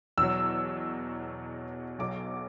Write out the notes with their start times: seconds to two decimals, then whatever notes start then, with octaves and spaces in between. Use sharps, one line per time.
0.17 E2 B2 F#3 E6
1.99 B1 B2 F#3 D6